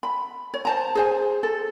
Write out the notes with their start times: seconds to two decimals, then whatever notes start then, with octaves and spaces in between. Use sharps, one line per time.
0.03 B5
0.54 C#5
0.65 C5 A5 A#5
0.95 G#4 C5 G#5
1.43 A4